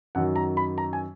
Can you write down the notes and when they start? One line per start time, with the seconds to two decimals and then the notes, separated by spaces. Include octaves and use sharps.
0.15 F#2 D#3 F#3 F#5
0.36 A#5
0.57 B5
0.78 A#5
0.93 G#5